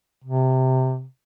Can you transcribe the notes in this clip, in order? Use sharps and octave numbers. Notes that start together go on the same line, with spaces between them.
C3